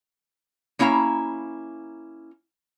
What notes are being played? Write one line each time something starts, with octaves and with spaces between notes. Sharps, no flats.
A#3 C#4 E4 F5 A#5